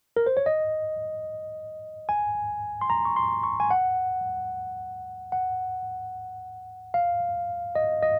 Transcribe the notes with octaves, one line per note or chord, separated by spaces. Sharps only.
A#4
C5
C#5
D#5
G#5
C6
A#5
C#6
C6
C#6
G#5
F#5
F#5
F5
D#5
D#5